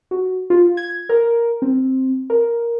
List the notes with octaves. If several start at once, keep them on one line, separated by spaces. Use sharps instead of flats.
F#4
F4
G#6
A#4
C4
A#4